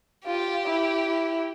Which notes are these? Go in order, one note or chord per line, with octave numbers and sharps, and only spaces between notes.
F4 G4
E4
E4